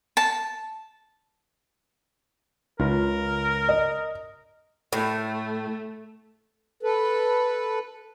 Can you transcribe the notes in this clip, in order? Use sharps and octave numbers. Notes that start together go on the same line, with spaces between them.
A5
C#2 F4 A#4
D#5
A2 A3
A4 B4